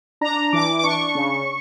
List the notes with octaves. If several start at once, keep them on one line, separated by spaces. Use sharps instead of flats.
D4 A#5
E3 D6
D6
D4 C#6
C#3